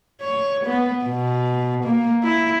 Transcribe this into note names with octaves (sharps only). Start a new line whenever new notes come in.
C#5
B3
B2
A#3
E4